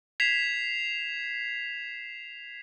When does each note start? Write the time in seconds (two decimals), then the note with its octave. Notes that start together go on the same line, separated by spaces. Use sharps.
0.20 G#6 B6 C7 E7 F7